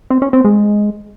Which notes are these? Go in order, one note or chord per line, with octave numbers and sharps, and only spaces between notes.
C4
C#4
C4
G#3